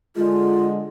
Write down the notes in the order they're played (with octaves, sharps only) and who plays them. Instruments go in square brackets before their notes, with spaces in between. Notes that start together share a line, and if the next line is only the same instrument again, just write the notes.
[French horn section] D3 G#3 [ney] F4